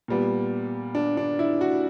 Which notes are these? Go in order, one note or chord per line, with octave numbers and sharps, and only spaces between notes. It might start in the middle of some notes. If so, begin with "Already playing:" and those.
A#2 G3 B3
D4
D4
E4
F#4